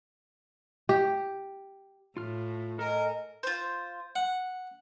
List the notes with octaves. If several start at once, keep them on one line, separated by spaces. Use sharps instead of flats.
G4
A2 F4 F6
A4 A#4 D#5 G#5
F4 C5
F#5